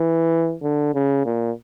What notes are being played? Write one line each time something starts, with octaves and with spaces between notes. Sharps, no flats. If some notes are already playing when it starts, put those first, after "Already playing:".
Already playing: E3
D3
C#3
A#2